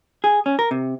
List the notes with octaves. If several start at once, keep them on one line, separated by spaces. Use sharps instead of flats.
G#4
C#4
A#4
C3